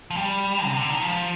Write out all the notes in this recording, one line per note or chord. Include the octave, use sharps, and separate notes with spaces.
F3
G3
C3
D3
D#3
F3